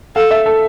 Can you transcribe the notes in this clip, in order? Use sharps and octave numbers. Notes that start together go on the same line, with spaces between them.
A4 F5
E5
A4